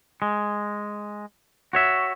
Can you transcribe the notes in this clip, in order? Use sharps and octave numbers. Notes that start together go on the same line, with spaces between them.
G#3
F#4 C#5 E5